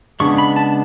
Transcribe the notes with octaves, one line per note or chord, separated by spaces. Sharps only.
C#3 G#3 B3 D4 C#6
B5
A5